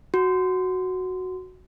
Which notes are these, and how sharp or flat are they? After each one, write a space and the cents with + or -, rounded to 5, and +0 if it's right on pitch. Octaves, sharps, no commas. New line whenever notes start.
F#4 +0